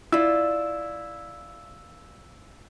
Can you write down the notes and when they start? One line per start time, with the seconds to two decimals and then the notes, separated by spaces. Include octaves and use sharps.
0.12 E4 F4 D5 E6